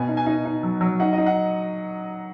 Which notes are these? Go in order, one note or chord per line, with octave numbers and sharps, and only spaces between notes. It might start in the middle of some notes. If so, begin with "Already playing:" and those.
Already playing: B2 B3 G#5
D#4
G#5
D#4
D#4
F#3
F#3
D#4 F#5
D#4 D#5
F#5